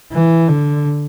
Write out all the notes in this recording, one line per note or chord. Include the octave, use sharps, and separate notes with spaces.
E3
D3